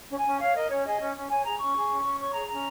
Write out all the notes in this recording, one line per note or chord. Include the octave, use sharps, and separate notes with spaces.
C#4
G#5
C#4
C#5 F5
A#4 D#5
C#4 C#5
G#4 D#5
C#4
C#4
C#5 G#5
G#4 A#5
C#4 C#6
G#4
C#4
C#4
C#5 C#6
G#4 A#5
C#4 A#5